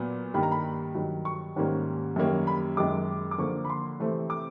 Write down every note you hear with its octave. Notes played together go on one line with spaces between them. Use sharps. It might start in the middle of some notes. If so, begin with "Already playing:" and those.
Already playing: A#2 F#3 B3
G2 D#3 G3 A#3 B5
A#5
B5
G2 D#3 F#3
C#6
G#2 D#3 G3 A#3 C#4
F#2 D#3 G3 A#3 C#4
B5
F#2 D#3 G#3 D6
D6
D3 F3 A#3 C#6
B5
C6
C3 E3 A3 C4
D6